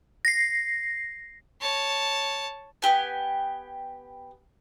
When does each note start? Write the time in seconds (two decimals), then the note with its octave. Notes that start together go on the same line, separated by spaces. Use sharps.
0.25 A#6 C7
1.61 C#5 A5
2.82 B3 C4 G4 G#5